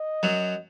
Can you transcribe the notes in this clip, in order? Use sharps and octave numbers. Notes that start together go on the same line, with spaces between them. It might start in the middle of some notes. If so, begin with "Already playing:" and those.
Already playing: D#5
F#2 F#3